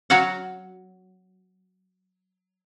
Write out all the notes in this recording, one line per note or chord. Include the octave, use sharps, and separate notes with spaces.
F#3 F#4 C#5 F5 F#5